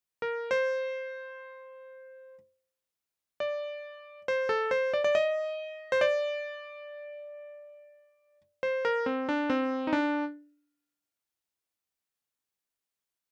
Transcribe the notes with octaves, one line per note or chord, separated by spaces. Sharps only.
A#4
C5
D5
C5
A4
C5
D5
D5
D#5
C5
D5
C5
A#4
C4
D4
C4
D#4
D4